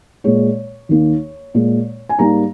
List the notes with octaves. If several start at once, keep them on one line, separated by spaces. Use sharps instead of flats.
A#2 G#3 C#5
D#2 D#3 A#3
A#2 G#3
G#5
G#2 G3 A#3 A#5